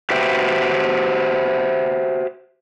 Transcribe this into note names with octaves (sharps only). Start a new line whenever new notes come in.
F#4 G4 B4 C5 E5 G5